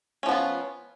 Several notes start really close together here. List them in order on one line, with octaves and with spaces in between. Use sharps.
C#4 F3 B3 F4